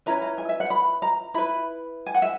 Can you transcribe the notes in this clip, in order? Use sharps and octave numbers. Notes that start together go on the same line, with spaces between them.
C#4 E4 B4 A#5
A#5
G#5
E5
F#5
B5
A#5
E4 B4 B5
G#5
F#5
E5